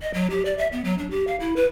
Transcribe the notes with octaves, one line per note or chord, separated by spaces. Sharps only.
D#5
F#3
G4
D5
E5
B3
F#3
D4
G4
F5
E4
B4